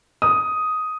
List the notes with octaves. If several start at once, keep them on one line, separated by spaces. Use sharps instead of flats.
D#6